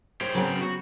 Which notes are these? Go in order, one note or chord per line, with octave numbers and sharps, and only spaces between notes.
G#4 C5 C#5 G5
C#3 F#3 B3 C4
F#4